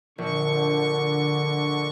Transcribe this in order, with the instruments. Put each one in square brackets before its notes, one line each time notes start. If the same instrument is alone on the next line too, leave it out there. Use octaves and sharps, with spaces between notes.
[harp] A#1 [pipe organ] D3 C#6